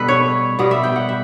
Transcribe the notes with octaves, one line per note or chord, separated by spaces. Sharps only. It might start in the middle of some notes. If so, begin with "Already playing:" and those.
Already playing: B2 G3 B3 A4 B4
C#5
B2 G3 B3 D5
E5
G5
F#5
E5